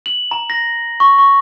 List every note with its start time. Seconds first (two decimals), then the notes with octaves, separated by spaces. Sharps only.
0.06 F#7
0.31 A#5
0.50 A#6
1.00 C#6
1.18 C#6